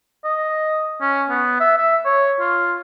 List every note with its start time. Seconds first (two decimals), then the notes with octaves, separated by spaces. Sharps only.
0.24 D#5
1.01 C#4
1.30 B3
1.60 E5
1.77 E5
2.05 C#5
2.40 F4